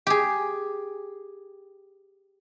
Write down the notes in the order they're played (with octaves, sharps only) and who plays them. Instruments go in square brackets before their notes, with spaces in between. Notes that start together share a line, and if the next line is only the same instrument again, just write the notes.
[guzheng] G4 G#4